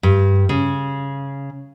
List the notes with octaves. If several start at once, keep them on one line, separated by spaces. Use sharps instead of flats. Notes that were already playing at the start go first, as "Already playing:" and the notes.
G2
C#3